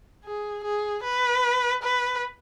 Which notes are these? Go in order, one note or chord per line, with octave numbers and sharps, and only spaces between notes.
G#4
G#4
B4
B4